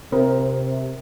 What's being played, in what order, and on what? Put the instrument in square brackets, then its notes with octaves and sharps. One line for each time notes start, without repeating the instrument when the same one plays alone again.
[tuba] C3 [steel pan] C4 A#4